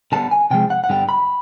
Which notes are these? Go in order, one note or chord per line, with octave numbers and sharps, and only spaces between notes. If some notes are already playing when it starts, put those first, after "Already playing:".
D3 G3 B3 A5
G#5
C3 F3 G#3 G5
F#5
F#5
G2 D3 G3 B3 G5
B5